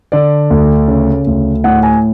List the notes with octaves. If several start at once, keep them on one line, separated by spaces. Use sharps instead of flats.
D3 D5
D2
C#3
D2
A2 F#5
G#5